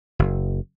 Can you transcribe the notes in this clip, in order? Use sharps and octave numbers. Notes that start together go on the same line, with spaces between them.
F#1